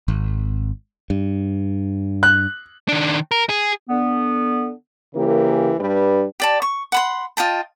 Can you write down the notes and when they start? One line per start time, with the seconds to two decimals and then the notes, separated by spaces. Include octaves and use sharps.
0.08 G#1
1.10 G2
2.23 F#6
2.88 D#3 D4
3.31 A#4
3.49 G#4
3.90 D3 B3
5.16 C#3 E3 A#3 C#4 G4 A#4
5.80 G2 G3 D4 B4
6.40 G4 D5 A5
6.62 C#6
6.92 F#5 B5 C6
7.37 F4 D#5 G5 A5